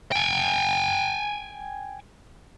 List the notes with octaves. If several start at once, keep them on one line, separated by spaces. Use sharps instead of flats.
G5 G#5